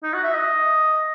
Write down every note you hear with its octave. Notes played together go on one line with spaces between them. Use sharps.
D#4
F#4
E5
D#5